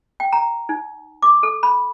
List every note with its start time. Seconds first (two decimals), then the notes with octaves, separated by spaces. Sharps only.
0.20 G5
0.33 A#5
0.69 D#4
1.22 D6
1.43 A4
1.63 B5